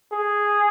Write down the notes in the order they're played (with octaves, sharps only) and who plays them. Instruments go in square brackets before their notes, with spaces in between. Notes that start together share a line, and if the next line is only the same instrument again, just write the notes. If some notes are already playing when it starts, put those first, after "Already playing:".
[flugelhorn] G#4